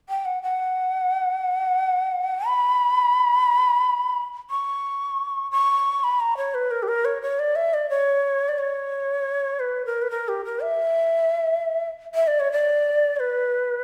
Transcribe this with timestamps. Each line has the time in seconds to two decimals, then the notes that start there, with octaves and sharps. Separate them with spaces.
0.09 G5
0.25 F#5
0.43 F#5
2.47 B5
4.50 C#6
5.52 C#6
6.04 B5
6.20 A#5
6.37 C#5
6.54 B4
6.71 A#4
6.83 G4
6.88 A#4
7.05 C#5
7.22 C#5
7.39 D5
7.56 E5
7.74 D5
7.90 C#5
8.49 D5
8.59 C#5
9.60 B4
9.86 A#4
10.02 B4
10.11 A#4
10.28 G4
10.45 A#4
10.62 E5
12.15 E5
12.27 D5
12.40 C#5
12.52 D5
13.16 C#5
13.20 B4